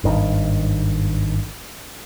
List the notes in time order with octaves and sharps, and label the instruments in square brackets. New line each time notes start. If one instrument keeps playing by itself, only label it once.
[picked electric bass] G#1 G2 D#3